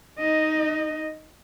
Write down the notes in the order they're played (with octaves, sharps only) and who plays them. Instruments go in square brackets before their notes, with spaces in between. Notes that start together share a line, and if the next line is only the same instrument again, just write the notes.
[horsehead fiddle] D#4 D#5